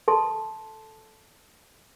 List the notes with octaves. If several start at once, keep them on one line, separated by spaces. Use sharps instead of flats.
A4 A5 C6